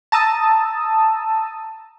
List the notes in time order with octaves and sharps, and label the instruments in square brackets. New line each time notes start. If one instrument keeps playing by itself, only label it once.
[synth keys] A5 A#5 D#6 E6